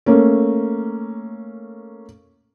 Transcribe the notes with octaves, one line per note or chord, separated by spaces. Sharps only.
A3 A#3 C#4